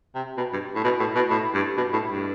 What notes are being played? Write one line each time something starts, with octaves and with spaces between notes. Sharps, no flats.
C3
B2
G2
A2
B2
A2
B2
A2
G2
B2
A2
G2